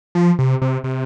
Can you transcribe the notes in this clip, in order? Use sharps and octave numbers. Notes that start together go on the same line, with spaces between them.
F3
C3
C3
C3